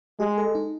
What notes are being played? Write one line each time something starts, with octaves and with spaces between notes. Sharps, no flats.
G#3 G4
A4
D#4